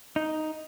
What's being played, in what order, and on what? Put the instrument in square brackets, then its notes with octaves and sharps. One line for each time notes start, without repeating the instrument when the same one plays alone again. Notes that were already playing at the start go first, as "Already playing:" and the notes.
[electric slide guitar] D#4